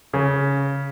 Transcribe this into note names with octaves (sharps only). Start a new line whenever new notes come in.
C#3